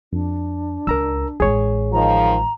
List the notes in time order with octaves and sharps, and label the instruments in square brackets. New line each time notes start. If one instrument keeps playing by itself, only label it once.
[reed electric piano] F2 [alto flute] D4
[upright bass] C#2 [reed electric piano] A#4 A#5 E6
[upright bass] A1 G#3 [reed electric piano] G#4 C#5
[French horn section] D#3 F3 [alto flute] A#5